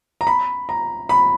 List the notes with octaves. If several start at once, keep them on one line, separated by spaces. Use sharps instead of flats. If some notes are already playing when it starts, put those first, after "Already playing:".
A#5
B5
A#5
B5